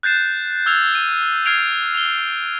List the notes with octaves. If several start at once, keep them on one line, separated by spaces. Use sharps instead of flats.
F#6 G6 A6 C7 E7
E6 F6 G#6 F7
D#7
F6 G#6 C7 D7 F7
F7 G7